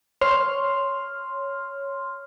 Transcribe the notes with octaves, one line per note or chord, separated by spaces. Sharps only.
C#5 C6 F6